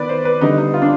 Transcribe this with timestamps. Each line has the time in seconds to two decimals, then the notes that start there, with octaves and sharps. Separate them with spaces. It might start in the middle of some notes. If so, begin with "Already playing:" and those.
Already playing: D#3 B3 B4 D5
0.09 C5
0.25 B4
0.41 D3 G3 B3 D#4
0.58 D#4
0.74 F4
0.82 D4